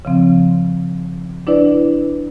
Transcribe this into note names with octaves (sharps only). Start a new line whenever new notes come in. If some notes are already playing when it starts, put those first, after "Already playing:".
C#3 F3 C4
D4 E4 B4 D5